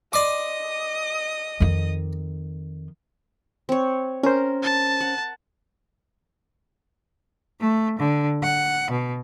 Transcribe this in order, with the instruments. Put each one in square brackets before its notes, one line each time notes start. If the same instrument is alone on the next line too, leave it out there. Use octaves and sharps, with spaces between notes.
[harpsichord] D5 C6 D6 [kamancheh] D#5 D#6
[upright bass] F2 D#3
[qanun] C4 C#5
[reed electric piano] C#4 C5 [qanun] A#4
[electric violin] A5
[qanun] F#5
[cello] A3
D3
F#5
B2